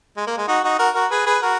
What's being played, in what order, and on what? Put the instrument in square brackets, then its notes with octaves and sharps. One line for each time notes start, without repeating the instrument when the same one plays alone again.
[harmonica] G#3
A#3
G#3
D#4 F#4
D#4 F#4
F#4 A#4
F#4 A#4
G#4 B4
G#4 B4
F#4 A#4